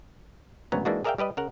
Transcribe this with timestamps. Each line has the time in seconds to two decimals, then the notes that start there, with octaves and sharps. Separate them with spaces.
0.72 G#1 D2 F#3 B3 C#4 A#5
0.85 E3 G#3 A#3 D4 D#4 F#4
1.04 G#4 A#4 D5 E5 F5 G5
1.18 G3 G4 B4 D#5
1.37 C#3 A#4 F#5